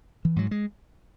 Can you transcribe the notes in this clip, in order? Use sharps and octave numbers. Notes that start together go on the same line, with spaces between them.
E3
G#2 F#3
G#3